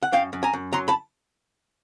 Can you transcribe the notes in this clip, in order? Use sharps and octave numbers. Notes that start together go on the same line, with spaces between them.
F#5
F#2 F5 G5
F#2
G#5 A#5
F#2
F#3 A#5 C6
A5 B5